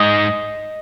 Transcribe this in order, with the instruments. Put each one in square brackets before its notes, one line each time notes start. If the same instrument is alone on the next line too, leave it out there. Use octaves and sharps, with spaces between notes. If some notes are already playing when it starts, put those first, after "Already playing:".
Already playing: [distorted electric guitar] G#2 [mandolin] D#5